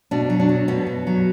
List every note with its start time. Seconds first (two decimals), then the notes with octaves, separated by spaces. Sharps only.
0.11 B2 D4
0.30 F#3
0.40 D4
0.49 F#3
0.68 B2 B3
0.87 B2
1.07 F#3